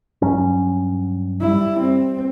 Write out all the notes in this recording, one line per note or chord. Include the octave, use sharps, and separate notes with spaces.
G2 F#3 C#4
G3 E4
C4